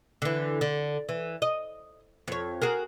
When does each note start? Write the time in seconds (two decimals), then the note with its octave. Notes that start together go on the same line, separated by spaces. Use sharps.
0.22 D3 E3
0.61 D3
1.09 E3
1.42 D#5
2.28 F2 C#5
2.62 F#4 G#4 A#4